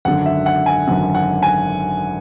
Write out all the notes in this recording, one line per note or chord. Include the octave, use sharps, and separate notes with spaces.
G#1 F#2 D3 F#5
E5
F#5
G#5
G#1 F#2 D3 F#5
F#5
G#5